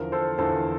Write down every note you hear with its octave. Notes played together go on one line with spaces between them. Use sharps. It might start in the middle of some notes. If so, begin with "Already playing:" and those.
Already playing: E2 D3 F3 A#4
A4 C5
E2 D3 F3 A4 C5